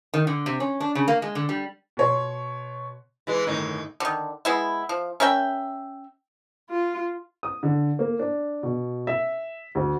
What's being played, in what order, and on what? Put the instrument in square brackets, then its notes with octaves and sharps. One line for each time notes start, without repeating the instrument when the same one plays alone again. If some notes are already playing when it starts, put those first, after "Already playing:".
[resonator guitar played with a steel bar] D#3
D3
C3
C#4
D4
C#3
A#3
G#3
D3
G3
[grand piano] B2 C#5 C6
[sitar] E3 G#3
[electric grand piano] G1 A2 D#3 [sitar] D#4
[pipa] D3 D#3
G#3 B3 E4
F3
C#4 A#4 E5 G5
[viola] F4
[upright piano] D#6
D3
A#3
D4
B2
E5
D2